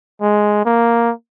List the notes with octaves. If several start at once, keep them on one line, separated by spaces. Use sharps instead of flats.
G#3
A#3